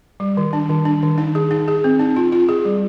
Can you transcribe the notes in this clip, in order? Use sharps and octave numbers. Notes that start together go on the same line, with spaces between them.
G3
D#3
D4
D#3
D4
D#3
D#4
G#4
D#4
G#4
C4
D#4
F4
F4
G#4
G3